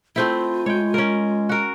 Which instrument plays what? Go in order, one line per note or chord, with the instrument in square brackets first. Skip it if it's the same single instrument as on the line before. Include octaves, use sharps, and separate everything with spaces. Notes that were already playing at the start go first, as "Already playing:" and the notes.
[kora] A3 C4 E4 [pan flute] F4
[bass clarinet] G#3 [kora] C#5 G5
[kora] C#4 A#4
F#4 A#4